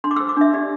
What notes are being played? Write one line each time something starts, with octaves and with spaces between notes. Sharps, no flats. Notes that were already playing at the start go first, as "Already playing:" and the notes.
D4 C6
D6
C5 E6
D6
D4 E5
G4 D5